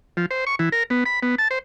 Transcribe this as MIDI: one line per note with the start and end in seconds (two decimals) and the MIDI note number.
0.17 0.26 53
0.31 0.45 72
0.47 0.55 85
0.59 0.69 52
0.72 0.83 70
0.90 1.04 59
1.06 1.20 83
1.23 1.35 59
1.38 1.48 81
1.51 1.59 72